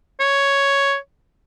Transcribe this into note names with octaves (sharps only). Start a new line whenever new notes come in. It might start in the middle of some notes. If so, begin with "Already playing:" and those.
C#5